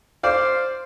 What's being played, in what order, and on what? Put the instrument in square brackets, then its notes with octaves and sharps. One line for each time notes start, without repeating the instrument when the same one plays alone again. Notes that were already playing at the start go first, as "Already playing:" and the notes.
[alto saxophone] C5 [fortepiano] D5 F5